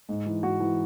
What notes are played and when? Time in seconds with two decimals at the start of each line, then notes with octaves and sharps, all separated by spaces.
0.09 G#2
0.26 E3
0.43 G#2 F#4
0.60 E3